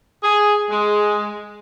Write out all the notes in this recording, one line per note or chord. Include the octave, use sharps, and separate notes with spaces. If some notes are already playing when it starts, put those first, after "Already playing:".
G#4
G#3